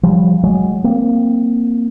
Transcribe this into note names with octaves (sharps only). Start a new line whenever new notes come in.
F3 G3
F#3 G#3
A#3 C4